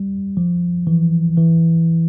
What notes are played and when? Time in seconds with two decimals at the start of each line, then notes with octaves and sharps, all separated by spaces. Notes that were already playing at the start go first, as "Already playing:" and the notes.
Already playing: G3
0.37 F3
0.87 E3
1.37 E3